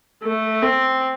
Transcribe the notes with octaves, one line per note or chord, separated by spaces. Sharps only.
A3
C4